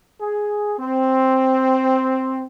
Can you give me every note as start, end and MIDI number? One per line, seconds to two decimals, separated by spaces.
0.21 0.74 68
0.79 2.45 60